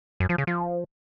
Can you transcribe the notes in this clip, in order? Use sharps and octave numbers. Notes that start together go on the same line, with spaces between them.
F#2
F3
C#3
F3